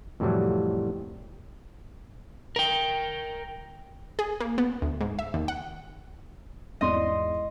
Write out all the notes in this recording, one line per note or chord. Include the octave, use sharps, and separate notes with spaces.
F2 A2 C3 E3 F#3 G3
A#4 G5
G#4
A#3
B3
D2
G#2
E5
D#2
F#5
G#1 E2 D5 D#5 C6